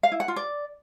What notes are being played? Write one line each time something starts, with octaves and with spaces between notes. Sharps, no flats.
F5
E4
F#5
F4
D5